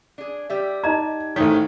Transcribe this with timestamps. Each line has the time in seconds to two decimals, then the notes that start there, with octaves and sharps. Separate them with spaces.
0.18 D4 G#4
0.50 G3 G4 E5
0.84 D#4 D#5 A#5 G#6
1.36 A1 D#3 A3 C5 C#5 B6